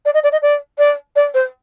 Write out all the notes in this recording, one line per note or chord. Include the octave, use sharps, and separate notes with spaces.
D5
D#5
D5
D#5
D5
D5
D5
C5